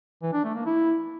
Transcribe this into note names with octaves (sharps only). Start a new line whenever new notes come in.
E3
D4
A3
A#3
E4